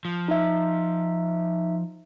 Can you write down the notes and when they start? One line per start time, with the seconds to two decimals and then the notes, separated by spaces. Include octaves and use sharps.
0.05 F3
0.28 D#4 E5